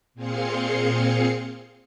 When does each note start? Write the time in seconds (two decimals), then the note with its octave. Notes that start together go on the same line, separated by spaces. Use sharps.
0.14 A#2 C4 G#4 F5 C6 C#7